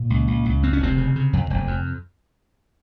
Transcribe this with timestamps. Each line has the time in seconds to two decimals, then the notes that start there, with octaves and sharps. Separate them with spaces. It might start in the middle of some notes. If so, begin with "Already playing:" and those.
Already playing: A#2 A#3
0.10 C#2
0.28 C#2
0.45 C#2
0.63 F2 C4
0.73 C#4
0.80 F1 C3 C4
0.98 C#3
1.16 C#3
1.33 F2
1.50 F1
1.67 F2